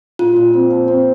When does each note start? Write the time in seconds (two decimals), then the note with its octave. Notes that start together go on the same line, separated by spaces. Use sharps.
0.19 A#2 F4
0.36 A#2
0.53 C4
0.70 F3
0.88 C4